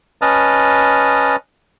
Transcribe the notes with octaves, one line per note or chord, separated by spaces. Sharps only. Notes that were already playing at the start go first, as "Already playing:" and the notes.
C#4 B4 D#5 A5 D#6 F6